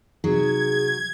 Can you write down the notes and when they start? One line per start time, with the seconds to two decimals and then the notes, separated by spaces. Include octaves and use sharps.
0.24 C3 F#3 D#4 G#4 G#6